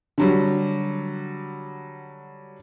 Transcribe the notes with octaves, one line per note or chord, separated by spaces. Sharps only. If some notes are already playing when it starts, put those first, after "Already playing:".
D3 F#3 G3